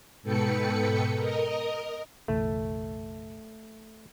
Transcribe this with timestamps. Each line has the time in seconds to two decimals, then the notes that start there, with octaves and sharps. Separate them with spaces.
0.22 G#2 B2 A4 B4 G5 C#7
1.17 A#4 D#5
2.28 F#1 B1 E3 A3